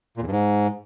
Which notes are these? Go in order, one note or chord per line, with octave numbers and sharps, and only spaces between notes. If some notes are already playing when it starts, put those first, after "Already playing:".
A#2
E2
G2
G#2